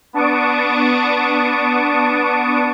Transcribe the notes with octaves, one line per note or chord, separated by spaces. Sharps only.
B3 D4 A5 C#6 D#6 D7